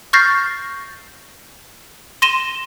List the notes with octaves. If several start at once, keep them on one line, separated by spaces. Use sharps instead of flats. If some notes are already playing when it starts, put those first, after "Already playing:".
C#6 F6 G6 A6 A#6 C7
C6 A#6 D#7 E7 G7